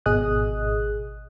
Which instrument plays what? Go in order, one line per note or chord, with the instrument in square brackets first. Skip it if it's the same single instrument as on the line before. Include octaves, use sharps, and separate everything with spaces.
[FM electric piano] G#1 B2 G#4 D#5 D#6 F#6